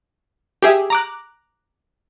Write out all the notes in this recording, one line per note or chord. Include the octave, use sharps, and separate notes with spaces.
G4 G#4 E5
A#5 D6 F#6